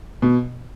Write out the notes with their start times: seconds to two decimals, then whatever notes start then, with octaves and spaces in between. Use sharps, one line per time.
0.22 B2